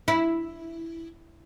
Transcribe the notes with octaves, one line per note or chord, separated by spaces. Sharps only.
E4